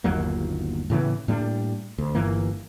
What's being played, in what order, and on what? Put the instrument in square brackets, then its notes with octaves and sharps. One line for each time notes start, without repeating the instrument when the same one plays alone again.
[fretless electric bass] G1 D#2 F#3 A#3
A2 C#3 E3 B3
A2 G3 A#3 D4
D2
G1 G2 E3 A#3